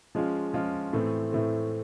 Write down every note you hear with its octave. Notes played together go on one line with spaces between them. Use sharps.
F3 G#3 C#4 F4
F3 G#3 C#4 F4
A2 E3 A3 C4
A2 E3 A3 C4